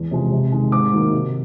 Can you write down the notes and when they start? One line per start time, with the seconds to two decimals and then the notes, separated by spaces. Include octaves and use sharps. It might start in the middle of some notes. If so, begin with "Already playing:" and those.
Already playing: E2
0.11 C3 F3 G#3
0.32 C3
0.52 D#3 G#3
0.72 G#2 D6
0.93 D#3 F#3 A#3
1.13 C3